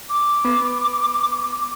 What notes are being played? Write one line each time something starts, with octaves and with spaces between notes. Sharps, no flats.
D6
B3